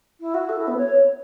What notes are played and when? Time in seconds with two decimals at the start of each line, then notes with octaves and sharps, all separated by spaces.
0.20 E4
0.34 F#4
0.49 A4
0.58 E4
0.67 B3
0.77 C#5